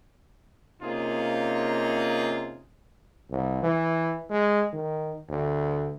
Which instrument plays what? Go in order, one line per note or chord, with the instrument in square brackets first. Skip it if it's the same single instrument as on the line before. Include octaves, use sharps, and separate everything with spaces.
[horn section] C3 A#3 C#4 D#4 F4 G#4
[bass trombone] C2
E3
G#3
D#3
D2